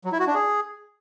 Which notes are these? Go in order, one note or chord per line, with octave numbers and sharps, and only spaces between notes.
F#3
E4
F#4
D4
G#4